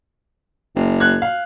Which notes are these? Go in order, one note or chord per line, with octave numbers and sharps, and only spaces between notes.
F#1
F#6 G#6
F5